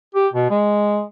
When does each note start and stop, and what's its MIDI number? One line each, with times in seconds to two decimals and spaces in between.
0.15 0.28 67
0.34 0.49 47
0.50 1.03 56